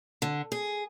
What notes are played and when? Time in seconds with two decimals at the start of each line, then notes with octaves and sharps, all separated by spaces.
0.22 D3
0.52 G#4